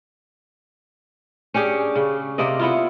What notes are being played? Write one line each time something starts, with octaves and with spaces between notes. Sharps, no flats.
C#4 D4 G4 G#4
C#3
C3 A#3 D5 D#5
B3 E4 F4